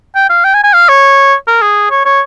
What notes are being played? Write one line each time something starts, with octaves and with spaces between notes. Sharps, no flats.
G5
F5
G5
G#5
G#5
F5
C#5
A#4
G#4
C#5
C#5